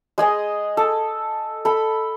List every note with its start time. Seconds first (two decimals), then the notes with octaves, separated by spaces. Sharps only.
0.18 G#3 G#4 D#5
0.77 A4
1.65 A4 B5